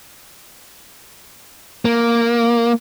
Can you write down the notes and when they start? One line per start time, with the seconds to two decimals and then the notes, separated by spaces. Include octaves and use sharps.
1.85 A#3